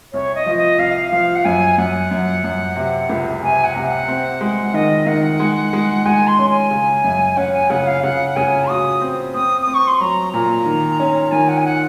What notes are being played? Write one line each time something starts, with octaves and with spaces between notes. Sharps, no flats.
C2 C#5
D#5
F3
D#5
C2 F5
F3 F5
F#5
F#2 G#5
F#2 F#5
F#2
F#2
C3
C#2
C3 G#5
F#5
C3
F#5
C4
G#3
D#3 D#5
D#3 F#5
G#3
G#3
G#3 G#5
C6
C#4
G#5
C#3
F#2
C#4 F#5
G#5
C#3 F#5
F5
C#3 F#5
C#3 G#5
F#4 D#6
C4
C4 D#6
D#6
C4
C#6
C6
F#3 A#5
A#2 A#5
D#3
C#4
D#3 G#5
F#5
G#5
F#5